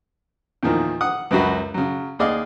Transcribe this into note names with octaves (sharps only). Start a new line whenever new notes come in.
E2 A#2 D#3 F3
F#5 D#6
C#2 F#2 F#3 F#4 B5
C#3 F#3
D#2 G#4 D5 D#5 F5